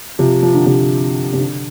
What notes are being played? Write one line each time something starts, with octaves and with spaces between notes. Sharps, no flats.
C3 F3
F3
D3
C3 F3
C3
D3